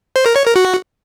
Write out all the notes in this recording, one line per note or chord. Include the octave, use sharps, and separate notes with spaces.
C5
A#4
C#5
A#4
F#4